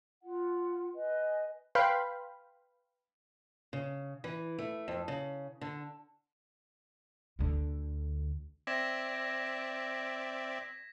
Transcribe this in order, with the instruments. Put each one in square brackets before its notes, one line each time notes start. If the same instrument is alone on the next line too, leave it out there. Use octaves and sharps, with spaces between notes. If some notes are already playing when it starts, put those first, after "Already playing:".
[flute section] F4 F#5
B4 D#5 G#5
[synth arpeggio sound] B4 F5 G5 B5 C6
[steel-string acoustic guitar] C#3
E3
A3
F2
C#3
D3
[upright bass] D2 D3
[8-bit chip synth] C4 D5 E5 [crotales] G#6 A#6 E7
[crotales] B6